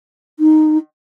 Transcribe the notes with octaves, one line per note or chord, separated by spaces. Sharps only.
D#4